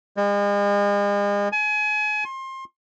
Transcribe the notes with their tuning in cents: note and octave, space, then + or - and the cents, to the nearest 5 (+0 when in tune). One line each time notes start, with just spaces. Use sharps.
G#3 -40
G#5 +30
C6 +30